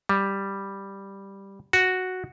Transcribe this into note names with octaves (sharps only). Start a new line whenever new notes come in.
G3
F#4